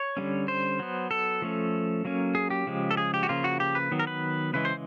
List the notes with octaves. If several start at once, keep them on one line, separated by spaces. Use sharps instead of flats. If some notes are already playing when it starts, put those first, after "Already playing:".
Already playing: C#5
D3 G3 A#3 C#4
C5
F#3 B3
A4
F3 A3 C#4
F#3 A#3 C#4
G#4
G4
C#3 F3 G#3
A4
G#4
G4
F#4
C#3 F3 A#3 F4
F#4
G4
B4
D#3 F#3 B3
A#4
B4
C#3 E3 G#3 B4
C5